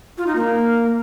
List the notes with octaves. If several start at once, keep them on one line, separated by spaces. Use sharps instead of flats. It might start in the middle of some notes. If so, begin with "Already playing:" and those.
F4
D#4
A#3